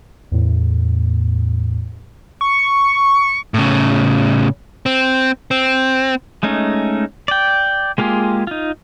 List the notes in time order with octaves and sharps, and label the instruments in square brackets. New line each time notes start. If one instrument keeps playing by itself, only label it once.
[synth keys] E2 A2
[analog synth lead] C#6
[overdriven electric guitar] A2 C#3
C4
C4
[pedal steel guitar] G#3 A3 C#4 D#4
D5 G5
G#3 A#3 F4 G4 G#4
D#4 F4